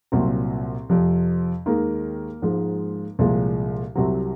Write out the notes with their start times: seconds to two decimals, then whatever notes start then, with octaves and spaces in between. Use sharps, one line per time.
0.12 C2 A#2 F#3 C4
0.89 F2 C3 F3
1.66 D#2 D#3 G#3 A#3
2.42 G#2 F3 G#3
3.19 C2 A#2 F3 G#3
3.95 C2 C3 F#3 C4